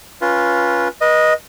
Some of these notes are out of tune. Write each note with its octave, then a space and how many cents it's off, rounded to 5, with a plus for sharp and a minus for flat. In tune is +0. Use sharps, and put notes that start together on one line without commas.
C#4 +0 F4 +0 B4 -20
B4 -35 D#5 +0